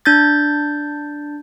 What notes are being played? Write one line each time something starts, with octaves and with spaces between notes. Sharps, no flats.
D4 G6 A6